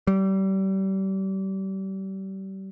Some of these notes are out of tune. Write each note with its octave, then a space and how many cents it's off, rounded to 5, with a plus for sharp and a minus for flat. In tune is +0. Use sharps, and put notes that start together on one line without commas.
G3 -30